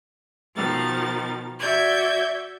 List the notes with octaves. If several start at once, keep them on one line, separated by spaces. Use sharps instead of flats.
B2 D#3 F3 A6
F#4 D5 E5 G6 G#6